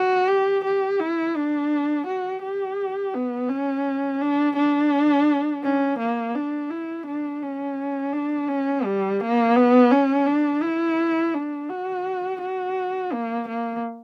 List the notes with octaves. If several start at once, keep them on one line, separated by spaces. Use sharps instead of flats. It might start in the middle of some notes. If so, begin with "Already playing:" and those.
Already playing: F#4
G4
G4
E4
D4
F#4
G4
B3
C#4
D4
D4
C#4
A#3
D4
E4
D4
C#4
D4
C#4
G3
A#3
B3
C#4
D4
E4
D4
F#4
F#4
A#3
A#3